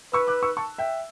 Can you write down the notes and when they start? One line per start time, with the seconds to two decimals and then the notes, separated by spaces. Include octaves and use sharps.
0.13 B4 C#6 E6
0.28 D6 F#6
0.43 C#6 E6
0.57 A5 C#6
0.78 E5 G5